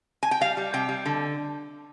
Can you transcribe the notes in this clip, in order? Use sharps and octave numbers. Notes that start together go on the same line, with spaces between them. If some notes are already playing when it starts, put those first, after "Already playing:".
G#5
G5
G3 F5
G3
C3 G5
G3
D3